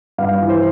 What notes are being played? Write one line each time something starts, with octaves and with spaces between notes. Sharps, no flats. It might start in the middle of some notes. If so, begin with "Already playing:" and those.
G2 F5
E3
C5